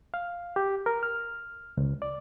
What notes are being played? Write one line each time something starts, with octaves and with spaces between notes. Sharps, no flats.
F5
G4
A#4
F6
C#2
D5